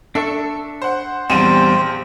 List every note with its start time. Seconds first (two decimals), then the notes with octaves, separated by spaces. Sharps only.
0.15 D4 A4 E5 C#6
0.82 C5 F#5
1.30 A#1 E2 G3 C4 G4 C5 D#7